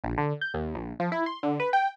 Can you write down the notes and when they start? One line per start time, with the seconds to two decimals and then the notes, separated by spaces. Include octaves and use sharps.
0.04 A#1
0.18 D3
0.41 G6
0.54 D#2
0.75 A#1
1.00 F3
1.12 E4
1.26 C6
1.43 D3
1.60 B4
1.73 G5